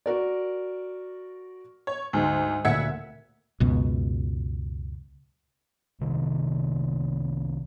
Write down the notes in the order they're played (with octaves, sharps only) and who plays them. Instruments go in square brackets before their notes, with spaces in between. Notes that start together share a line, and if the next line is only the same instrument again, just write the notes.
[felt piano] F#4 A#4 D5
[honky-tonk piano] C#5
[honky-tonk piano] D2 [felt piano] G#2
[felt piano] D2 A#2 C#7 [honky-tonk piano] E5 F#5 G#6
[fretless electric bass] C#2 F#2 B2
[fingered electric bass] C2 C3 D#3